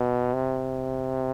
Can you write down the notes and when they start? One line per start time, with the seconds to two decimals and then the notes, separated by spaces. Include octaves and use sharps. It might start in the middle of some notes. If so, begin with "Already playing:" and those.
Already playing: B2
0.34 C3